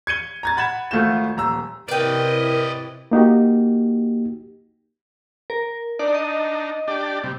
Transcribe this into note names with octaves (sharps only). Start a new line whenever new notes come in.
G#6 C#7 D#7 G7
A#5 G#6 A6
F#5 B5 G#6 E7
G#1 A3 F4 F#4 G6 E7
D#1 A#5 E6
C3 E4 A#4 B4 D5 D#5 G5
A#3 D#4 F#4 G4
A#4
D4 D#4 D5
D#5
D4 G4 D5
C3 G3